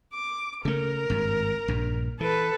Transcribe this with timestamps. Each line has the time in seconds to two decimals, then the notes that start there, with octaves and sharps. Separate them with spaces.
0.13 D6
0.65 C#3 A3 A#4
1.10 G#1 G2
1.68 A#1 G2
2.21 E3 A4 B4